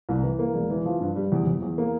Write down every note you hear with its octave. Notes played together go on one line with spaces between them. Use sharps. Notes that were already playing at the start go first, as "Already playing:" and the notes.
C2
E3
A#3
E1
E3
F3
G2
G3
E2
E2
E2
A#3